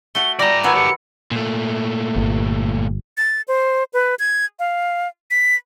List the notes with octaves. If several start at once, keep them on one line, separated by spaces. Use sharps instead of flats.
A3 F#4 G7
G3 D5 D#5 A#5 A#6
D#3 F#3 F#4 B4 G#5 B5 E6
G4 A4 C#7
A#2 A3
G1
A6
C5
B4
G#6
F5
B6